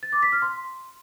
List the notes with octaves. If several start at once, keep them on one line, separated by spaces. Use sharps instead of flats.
A6
D6
B6
F6
C6